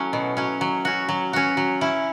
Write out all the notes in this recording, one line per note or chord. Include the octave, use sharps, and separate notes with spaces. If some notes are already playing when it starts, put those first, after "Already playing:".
Already playing: F#3 A3 C#4 E4
B2
F#3 C#4
F#3
C#4 F#4
F#3
C#4 F#4
F#3
C#4 E4